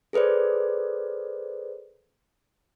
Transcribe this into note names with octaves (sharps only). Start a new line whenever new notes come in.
G#4 A4 B4 C5 D5